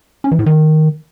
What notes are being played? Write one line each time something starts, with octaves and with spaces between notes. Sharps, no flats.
C#4
E3
A2
D#3